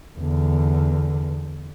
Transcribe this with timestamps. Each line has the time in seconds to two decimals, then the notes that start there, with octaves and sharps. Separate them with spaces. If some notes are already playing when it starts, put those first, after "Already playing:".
0.19 E2 D3